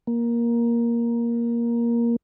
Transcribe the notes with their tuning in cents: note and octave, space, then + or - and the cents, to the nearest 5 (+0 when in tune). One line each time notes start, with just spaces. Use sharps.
A#3 +10